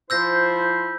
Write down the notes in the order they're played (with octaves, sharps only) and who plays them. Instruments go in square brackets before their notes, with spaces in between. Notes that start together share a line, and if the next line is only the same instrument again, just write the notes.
[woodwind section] F3 E4 C5 [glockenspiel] E6 G6 A#6